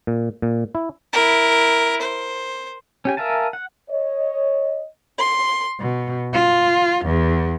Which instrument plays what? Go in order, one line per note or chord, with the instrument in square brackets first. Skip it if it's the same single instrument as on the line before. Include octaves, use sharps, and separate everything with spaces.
[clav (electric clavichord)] A#2
A#2
E4
[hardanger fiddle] E4 A#4
C5
[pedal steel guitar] C#4 G4 G#5
A#4 E5 F5 G#5 A5
F#5
[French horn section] C#5 D#5
[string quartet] C6
B2
F4
E2